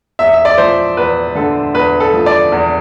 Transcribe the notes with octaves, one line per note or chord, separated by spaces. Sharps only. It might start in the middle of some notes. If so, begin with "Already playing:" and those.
E2 E5
E5
D5
F3 C5
E2 B4
D3 A4
E2 B4
A4
F3
D5
E2